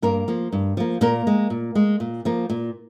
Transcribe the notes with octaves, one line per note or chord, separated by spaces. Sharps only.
G2 A#3 A#4
F3 A#3
G2
F3 A#3
A#2 A#3 A#4
G#3
A#2
G#3
A#2
F3 A#3
A#2